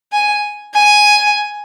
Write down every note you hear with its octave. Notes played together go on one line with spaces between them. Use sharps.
G#5
G#5